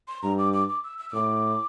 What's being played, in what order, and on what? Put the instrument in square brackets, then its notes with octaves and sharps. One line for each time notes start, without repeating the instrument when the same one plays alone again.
[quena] C6
[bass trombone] G2 [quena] A#5
[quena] D6
D6
D6
E6
E6
E6
[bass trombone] A2 [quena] D6